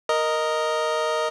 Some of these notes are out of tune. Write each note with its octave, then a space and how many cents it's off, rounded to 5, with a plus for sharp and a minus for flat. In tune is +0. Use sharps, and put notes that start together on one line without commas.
A#4 +0 D#5 +0